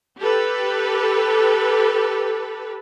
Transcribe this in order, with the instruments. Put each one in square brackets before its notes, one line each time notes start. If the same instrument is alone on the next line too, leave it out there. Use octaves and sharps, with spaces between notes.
[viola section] G4 A4 B4